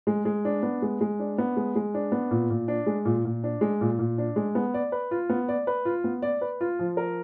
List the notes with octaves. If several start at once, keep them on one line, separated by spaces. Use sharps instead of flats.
G#3
G#3
D4
B3
G#3
G#3
D4
B3
G#3
G#3
D4
B3
A#2
A#2
D4
G#3
A#2
A#2
D4
G#3
A#2
A#2
D4
G#3
B3
D5
B4
F4
B3
D5
B4
F4
B3
D5
B4
F4
F3
A#4